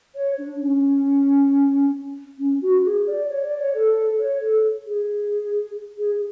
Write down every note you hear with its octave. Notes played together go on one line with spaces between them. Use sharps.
C#5
D4
C#4
C#4
F#4
G#4
D5
C#5
D5
C#5
A4
C#5
A4
G#4
G#4